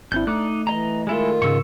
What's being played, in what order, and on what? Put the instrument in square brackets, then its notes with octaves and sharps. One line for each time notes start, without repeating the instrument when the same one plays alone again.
[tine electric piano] G#1 C4 E4 [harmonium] D4 [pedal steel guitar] G6
[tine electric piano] A3 [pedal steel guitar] D#4 D6 F#6
[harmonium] E3 [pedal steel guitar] D#5 A#5
[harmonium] D#3 F4 [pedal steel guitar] G#3 E4 A4
[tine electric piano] G#2 C#3 [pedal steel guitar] C#6 E6